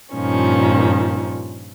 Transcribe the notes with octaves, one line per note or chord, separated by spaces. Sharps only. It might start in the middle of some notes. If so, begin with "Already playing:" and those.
G2 A#2 D#3 F3 C#4